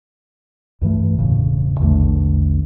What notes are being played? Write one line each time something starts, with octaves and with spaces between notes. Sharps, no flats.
C#2 G2 E3 A3
E1 A2 C#3
A#1 E2 D3 A3